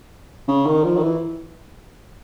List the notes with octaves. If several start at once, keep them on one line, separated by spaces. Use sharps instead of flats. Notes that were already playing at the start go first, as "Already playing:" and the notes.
C#3
D#3
F3
D#3
E3